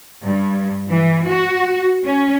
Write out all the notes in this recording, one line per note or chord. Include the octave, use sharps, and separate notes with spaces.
G2
E3
F#4
C#4